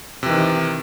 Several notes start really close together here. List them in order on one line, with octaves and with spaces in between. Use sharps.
C3 E3 D#3